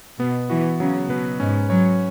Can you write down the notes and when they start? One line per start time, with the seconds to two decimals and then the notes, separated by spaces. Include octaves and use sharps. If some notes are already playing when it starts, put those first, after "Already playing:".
0.19 B2 B3
0.49 E3 F#4
0.80 C#3 F#3
1.09 B2 B4
1.40 G#2 C#4
1.70 F#3 C#5